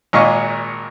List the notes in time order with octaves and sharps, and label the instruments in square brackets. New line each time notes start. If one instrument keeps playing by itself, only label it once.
[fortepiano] G#1 A#2 G#3 D#5 F5 C#6